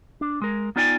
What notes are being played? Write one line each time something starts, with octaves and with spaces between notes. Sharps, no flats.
D4
G#3 A#4
B3 D#4 F4 D5 G5 G#5